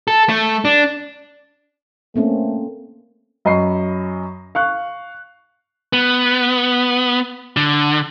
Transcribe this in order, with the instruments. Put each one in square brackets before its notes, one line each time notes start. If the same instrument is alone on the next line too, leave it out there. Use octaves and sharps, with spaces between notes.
[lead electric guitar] A4
A3
D4
[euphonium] A3 [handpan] A#3 C4 C#4
[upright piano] F#2 D#5 B5 C#6 C7
F5 C#6 F#6
[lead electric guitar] B3
D3